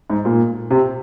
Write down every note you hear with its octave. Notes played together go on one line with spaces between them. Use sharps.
G#2
A#2
C3